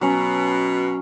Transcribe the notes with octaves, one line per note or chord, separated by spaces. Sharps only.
B2 F#3 C#4